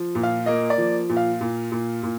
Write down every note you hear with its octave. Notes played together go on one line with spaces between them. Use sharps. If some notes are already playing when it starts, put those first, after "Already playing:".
Already playing: F3
A#2
F5
A#3 D#5
D5
F3
A#2
F5
A#2
A#2
A#2